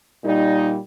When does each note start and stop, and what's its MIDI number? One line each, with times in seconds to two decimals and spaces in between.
0.24 0.77 46
0.24 0.77 55
0.24 0.77 63